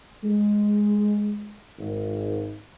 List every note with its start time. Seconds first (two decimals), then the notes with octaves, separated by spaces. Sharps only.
0.24 G#3
1.78 G#1